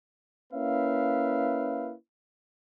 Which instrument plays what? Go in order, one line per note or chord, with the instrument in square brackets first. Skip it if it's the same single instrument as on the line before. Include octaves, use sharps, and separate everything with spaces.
[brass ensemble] A#3 C#4 E4 B4 E5 F5